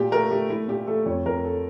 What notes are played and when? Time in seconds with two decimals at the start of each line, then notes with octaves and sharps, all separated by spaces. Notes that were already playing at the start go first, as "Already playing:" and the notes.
Already playing: A#2 G4
0.11 A3 A#4
0.31 A3 G4
0.49 A3 E4
0.68 A#2 G4
0.87 A3 A4
1.06 F2 C#5
1.26 F2 A#4
1.45 A4